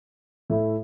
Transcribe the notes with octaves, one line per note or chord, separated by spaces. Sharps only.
A2 A3 E4